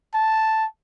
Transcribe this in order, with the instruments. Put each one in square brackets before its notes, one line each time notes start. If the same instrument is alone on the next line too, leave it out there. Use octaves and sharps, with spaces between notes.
[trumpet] A5